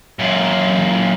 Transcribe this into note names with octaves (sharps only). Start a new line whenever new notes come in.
F#2 A#2